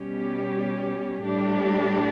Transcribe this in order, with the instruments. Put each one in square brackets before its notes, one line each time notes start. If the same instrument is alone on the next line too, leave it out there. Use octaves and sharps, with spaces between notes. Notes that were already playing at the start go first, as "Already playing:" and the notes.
Already playing: [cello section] B2 G3 C#4 G4
A2 G3 D4 G4